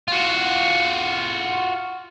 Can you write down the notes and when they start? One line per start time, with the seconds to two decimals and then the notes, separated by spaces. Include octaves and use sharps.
0.08 F4 F#4